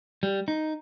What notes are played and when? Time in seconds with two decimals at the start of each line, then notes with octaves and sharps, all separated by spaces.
0.23 G3
0.48 D#4